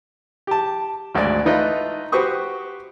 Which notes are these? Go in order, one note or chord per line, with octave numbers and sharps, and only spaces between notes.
G4 A5
G#1 D2 G#3 D5
E3 A3 D#4 F4 B4 D#5
F#4 G4 B4 C5 C#6 D#6